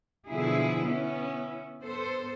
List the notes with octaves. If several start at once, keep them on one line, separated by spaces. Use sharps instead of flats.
B2 D3 F3 E4 G#4
B3 C#4 E4
B3 A4 C5